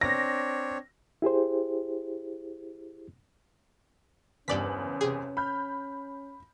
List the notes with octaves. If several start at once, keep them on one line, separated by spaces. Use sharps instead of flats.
C4 D4 C#5 A#6
E4 G4 G#4 C5
F#1 E2 G2 C#4 D5 B6 F#7
C3 G#4
B5 F6 G6